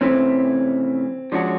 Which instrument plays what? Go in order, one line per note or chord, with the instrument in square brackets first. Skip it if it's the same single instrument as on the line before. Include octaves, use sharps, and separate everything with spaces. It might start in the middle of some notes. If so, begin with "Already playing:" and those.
[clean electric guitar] C3 E3 A3 C#4 [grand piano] C4
[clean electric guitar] F3 G#3 C#4 F#4 [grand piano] D4